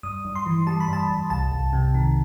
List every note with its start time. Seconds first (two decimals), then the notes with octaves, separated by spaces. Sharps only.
0.03 G2 D#6
0.25 G2
0.35 C6
0.46 E3
0.67 G3 A5
0.80 B5
0.88 G2 A5
1.10 G2
1.30 C2 A5
1.52 C2
1.73 C3
1.94 D#3